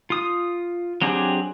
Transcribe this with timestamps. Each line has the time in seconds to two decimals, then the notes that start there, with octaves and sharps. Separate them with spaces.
0.10 F4 D#6
1.02 F#3 C4 D4 G4 G#4